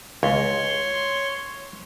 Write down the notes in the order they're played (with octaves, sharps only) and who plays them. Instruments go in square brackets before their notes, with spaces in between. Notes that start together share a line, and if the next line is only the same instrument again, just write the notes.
[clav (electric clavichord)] C#2 [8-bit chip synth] C#5 [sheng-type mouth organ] C6